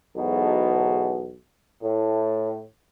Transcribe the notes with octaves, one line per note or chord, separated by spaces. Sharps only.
B1 E2 G#2 B2
A2